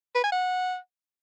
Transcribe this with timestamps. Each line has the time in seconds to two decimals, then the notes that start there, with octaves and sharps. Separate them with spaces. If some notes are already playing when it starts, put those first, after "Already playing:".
0.15 B4
0.24 G#5
0.32 F#5